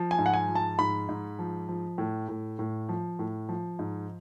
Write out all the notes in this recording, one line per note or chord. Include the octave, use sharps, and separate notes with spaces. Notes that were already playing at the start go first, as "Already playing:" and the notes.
Already playing: F3
G#5
G#2
F#5
G#5
F3
A5
G#2 B5
G#2
F3
F3
A2
A2
A2
F3
A2
F3
G#2